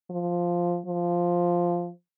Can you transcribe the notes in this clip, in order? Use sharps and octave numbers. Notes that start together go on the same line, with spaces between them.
F3
F3